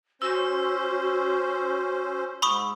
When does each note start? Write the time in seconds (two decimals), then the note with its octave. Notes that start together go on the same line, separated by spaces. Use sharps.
0.22 C#4 F#4 C5 E6
2.42 G#2 B5 C#6 D#6